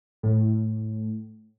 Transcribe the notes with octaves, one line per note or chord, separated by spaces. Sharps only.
A2